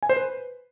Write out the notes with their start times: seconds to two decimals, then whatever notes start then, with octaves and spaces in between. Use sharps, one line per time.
0.03 G#5
0.09 C5
0.16 B4